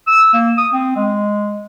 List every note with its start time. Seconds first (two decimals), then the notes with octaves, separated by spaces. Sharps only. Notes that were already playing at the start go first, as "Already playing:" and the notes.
0.07 E6
0.34 A#3
0.57 D#6
0.73 C4
0.97 G#3